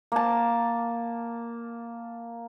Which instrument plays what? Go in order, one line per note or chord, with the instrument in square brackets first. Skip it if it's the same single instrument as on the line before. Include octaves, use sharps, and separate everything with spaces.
[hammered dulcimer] A#3 A5